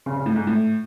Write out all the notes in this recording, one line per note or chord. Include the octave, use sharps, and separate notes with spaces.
C#3
C#3
A2
G#2
A2